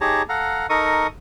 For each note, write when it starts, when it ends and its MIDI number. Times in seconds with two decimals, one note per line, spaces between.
0.01 0.22 63
0.01 0.22 67
0.01 0.22 68
0.01 0.22 73
0.01 0.22 81
0.01 0.22 82
0.29 0.66 69
0.29 0.66 77
0.29 0.66 78
0.29 0.66 82
0.70 1.07 63
0.70 1.07 69
0.70 1.07 70
0.70 1.07 75
0.70 1.07 85
0.70 1.07 87